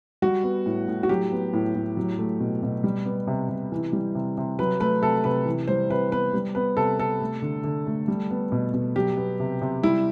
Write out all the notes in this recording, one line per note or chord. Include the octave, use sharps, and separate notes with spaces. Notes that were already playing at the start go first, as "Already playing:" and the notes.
G3 F#4
B3
A2
A2
F#4
F#3 G4
B3
A2
A2
F#3
A3
B2
B2
G3
B3
C3
C3
E3
G3
C3
C3
F#3 B4
A3 B4
C3 A4
C3 B4
E3
G3 C5
C3 B4
B3 B4
G3
B3 B4
C3 A4
C3 A4
A3
D3
D3
A3
G3
B3
B2
B2
F#3 G4
B3
C3
C3
G3 E4